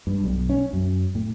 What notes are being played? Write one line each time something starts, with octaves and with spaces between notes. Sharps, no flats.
G2
B1
C#4
F#2
A2